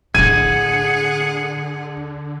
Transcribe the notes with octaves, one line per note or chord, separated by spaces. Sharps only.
A2 D3 D4 G#4 F#5 G#6 D#7